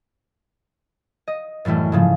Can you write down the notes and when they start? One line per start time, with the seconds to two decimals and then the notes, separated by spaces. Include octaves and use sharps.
1.28 D#5
1.65 F#2 A2 E3 G3 A3
1.92 G#2 C#3 F3